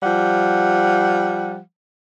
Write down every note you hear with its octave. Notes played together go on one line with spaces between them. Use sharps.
F3 G3 F#5